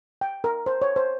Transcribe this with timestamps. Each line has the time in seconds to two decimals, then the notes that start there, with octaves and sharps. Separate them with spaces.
0.21 G5
0.44 A#4
0.66 C5
0.82 C#5
0.96 C5